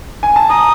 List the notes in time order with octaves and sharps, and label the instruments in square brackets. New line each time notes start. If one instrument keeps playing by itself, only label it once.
[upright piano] G#5
A5
[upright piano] A#5 [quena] D#6